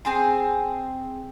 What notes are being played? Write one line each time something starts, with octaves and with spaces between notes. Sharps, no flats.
C4 G#4 C6